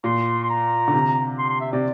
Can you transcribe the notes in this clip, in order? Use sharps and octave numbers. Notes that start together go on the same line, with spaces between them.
A#2 C6
C6
A#5
D3
C3
C6
C6
E5
C3 D5